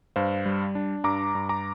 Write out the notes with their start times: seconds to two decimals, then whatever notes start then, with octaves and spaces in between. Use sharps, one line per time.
0.16 G2 C5 F5
0.46 G3
0.75 D4
1.04 G2 A#5 D6
1.35 G2
1.49 A#5 D6